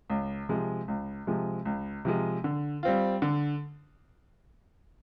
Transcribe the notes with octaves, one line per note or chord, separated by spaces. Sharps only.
C#2
C3 F3 G#3
C#2
C3 F3 G#3
C#2
C3 F3 G#3
D3
G3 C4 F4
D3